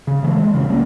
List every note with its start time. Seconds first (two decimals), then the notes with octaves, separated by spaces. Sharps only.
0.07 C#3
0.23 C#3 E3 G#3 A3
0.42 F3 G#3 A3
0.53 G#1 A2 C#3 E3
0.69 C#2 G3 A#3 C#4